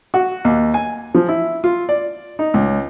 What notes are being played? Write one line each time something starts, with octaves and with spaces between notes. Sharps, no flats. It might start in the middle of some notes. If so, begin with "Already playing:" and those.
F#4
D#2
G#5
F3
E4
F4
D5
D#4
C#2